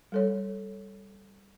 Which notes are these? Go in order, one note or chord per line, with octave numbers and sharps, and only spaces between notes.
G3 A4 C#5